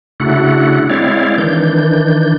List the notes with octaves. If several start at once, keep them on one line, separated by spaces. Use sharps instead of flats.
C#3 A3 D4 E4 F#4 F#5
G#3 C4 E4 C#5 D5 F5
D#3 E3 D4 G6